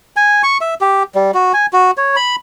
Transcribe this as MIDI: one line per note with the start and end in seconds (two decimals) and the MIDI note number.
0.16 0.42 80
0.43 0.58 85
0.61 0.75 76
0.81 1.03 67
1.15 1.31 55
1.34 1.52 66
1.53 1.66 80
1.73 1.91 66
1.97 2.16 73
2.16 2.36 83